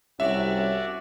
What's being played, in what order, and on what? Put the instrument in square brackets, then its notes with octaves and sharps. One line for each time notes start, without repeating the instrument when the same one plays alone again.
[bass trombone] C2 [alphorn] C#4 [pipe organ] F#4 D5 [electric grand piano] E5